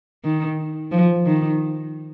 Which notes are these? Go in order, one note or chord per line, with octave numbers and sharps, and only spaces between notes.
D#3
F3
D#3